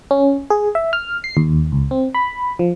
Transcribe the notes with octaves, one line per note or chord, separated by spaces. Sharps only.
C#4
G#4
E5
F6
C7
D#2
C#2
C4
B5
F3